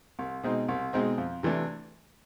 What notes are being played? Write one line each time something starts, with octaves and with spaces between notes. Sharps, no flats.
C2
B2 G#3 C4 D#4
C2
B2 G#3 C4 D#4
F2
C3 E3 A3 D4